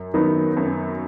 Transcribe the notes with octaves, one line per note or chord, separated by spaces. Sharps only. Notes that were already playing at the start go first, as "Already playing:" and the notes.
Already playing: F#2
D#3 F#3 B3 D#4
F#2